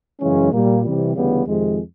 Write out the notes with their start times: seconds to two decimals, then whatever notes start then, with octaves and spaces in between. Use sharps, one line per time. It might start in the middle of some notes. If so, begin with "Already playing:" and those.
0.21 F#2 C#3 E3 G#3 C#4
0.52 A#2 G3 A#3
0.84 C3 E3 G3
1.15 D2 C#3 E3 G3 B3
1.47 F2 C3 D#3 G#3